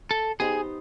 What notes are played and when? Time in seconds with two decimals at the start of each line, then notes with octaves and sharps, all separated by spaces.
0.11 A4
0.40 B3 D#4 G4 G#4 C5